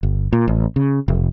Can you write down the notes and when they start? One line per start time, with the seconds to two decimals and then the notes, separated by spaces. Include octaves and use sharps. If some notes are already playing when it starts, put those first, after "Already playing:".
0.03 G1
0.33 A#2
0.48 A1
0.76 C#3
1.08 F1